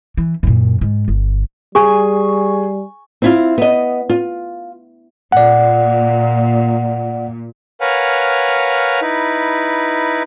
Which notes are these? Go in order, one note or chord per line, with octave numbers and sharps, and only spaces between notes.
E3
F#2 A#2
G#2
G1
G3 G#4 G#5 C#6
C4 E4 F4
B3 D#5
F4
A#2 D5 F#5
A#4 B4 C#5 F5 F#5 G#5
D#4 E4 B4